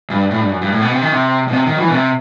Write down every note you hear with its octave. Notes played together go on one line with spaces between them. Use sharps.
G2
A2
G2
F#2
G2
A2
B2
C3
D#3
C3
B2
C3
D#3
F#3
E3
B2
C3